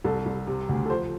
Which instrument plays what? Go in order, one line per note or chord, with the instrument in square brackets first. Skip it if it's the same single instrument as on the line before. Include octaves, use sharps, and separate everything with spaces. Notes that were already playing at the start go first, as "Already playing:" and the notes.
[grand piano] C2 A4
C2
C3
D2
A4
F3 C5